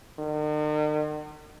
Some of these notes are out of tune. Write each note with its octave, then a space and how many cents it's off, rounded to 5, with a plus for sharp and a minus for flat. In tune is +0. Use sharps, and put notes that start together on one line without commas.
D#3 -45